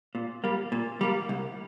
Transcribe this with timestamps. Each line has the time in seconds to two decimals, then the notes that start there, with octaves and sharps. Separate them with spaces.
0.15 A#2
0.44 G3 A#3
0.72 A#2
1.01 G3 A#3
1.29 C2